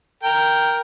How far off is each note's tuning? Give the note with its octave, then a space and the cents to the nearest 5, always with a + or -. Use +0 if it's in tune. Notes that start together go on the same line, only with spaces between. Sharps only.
A#4 +0 G5 +0